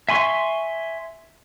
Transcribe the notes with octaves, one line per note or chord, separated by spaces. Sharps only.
E5 G#5 C6 C#6